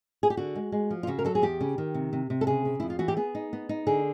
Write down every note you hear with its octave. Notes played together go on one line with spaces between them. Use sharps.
G#4
G4
D3 F#4
G#3
G#3
F3
F4
C#3 F#4
A#4
F#3 A4
G#4
E2 G4
C#3
D#3
C3
C3
C3
A4
C#3 G#4
C#3
F2 E4
F4
E3 F#4
G4
B3 G#4
D#4
B3
D#4
D3 G#4